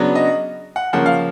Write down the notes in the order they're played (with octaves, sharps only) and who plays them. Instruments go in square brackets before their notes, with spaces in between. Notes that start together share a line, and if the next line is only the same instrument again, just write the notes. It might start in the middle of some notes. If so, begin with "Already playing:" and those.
Already playing: [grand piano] C#3 F#3 B3 D4
D#5
F#5
C#3 F3 A#3 C#4 F#5
F5